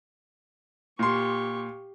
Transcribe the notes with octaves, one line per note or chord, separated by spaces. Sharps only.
A#2 G4 C6 C#6